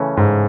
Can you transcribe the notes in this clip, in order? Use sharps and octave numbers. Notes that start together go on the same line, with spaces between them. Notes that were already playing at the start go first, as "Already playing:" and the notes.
Already playing: C#3 E3 A3 C#4
G#2